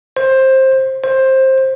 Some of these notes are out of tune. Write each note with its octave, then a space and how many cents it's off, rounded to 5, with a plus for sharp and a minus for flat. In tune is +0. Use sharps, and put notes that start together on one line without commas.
C5 +15
C5 +15